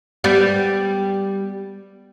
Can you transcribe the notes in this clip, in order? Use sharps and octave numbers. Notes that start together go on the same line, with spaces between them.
G3 B3